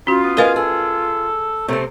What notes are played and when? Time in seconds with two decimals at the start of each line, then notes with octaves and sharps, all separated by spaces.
0.07 C#4 F4 F#4 C5
0.23 B3
0.37 G#4 A#4 B4 D#5 F5
0.56 G#4 A4
1.68 C3 A3 C4 A4